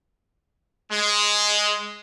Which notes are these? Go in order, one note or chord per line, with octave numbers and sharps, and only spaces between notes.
G#3